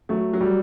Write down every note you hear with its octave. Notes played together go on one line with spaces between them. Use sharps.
F#3 A3
F#3
G3